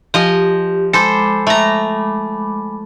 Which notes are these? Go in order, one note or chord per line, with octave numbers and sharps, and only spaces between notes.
F3 G4 D#5 G#5
G#3 A4 C5 B5 D6
A3 A#5